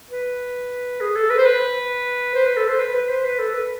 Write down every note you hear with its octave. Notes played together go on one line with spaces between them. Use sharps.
B4
G#4
A4
B4
C5
B4
C5
B4
A4
C5
B4
B4
C5
B4
A4
B4